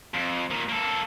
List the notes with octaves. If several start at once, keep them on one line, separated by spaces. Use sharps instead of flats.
F2
A#2 D#3
A#3 A4